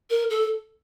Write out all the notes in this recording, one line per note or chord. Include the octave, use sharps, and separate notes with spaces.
A#4
A4